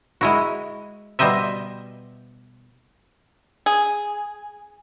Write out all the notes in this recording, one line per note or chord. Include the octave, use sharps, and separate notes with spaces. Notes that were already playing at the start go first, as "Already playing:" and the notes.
G#3 E4 F#4
B2 G3 C5 D#5 E5
G#4